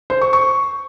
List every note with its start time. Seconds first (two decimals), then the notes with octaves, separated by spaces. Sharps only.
0.10 C5
0.21 C#6
0.33 C#6